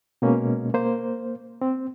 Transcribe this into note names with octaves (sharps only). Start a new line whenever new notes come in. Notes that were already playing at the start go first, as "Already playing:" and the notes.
B2 G#3 A#3 C#4
A#3 C5
C4